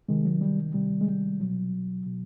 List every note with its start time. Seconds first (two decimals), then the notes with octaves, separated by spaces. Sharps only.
0.08 C3 D#3 G#3
0.25 F#3
0.41 G3
0.74 C3 D#3 G3
1.01 G#3
1.07 G3
1.40 B2 F#3
2.06 B2